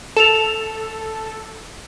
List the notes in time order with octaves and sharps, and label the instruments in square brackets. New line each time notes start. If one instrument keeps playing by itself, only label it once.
[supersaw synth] A4 [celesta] E7 F7